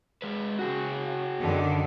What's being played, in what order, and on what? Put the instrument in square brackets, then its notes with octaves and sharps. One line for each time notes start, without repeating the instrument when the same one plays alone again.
[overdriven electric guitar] G#3 B4
[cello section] C#3 [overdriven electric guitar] F#4 G#4
[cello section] F#2 D3 D#3